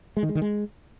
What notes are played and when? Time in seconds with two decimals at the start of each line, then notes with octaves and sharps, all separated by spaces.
0.17 G#3
0.23 D#3
0.29 G#3
0.35 D#3
0.42 G#3